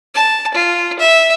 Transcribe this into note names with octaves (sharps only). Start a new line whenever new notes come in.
A5
F4
E5